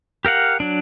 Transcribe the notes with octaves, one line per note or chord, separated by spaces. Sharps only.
G4 A#4 F5 F#5
F#3 D4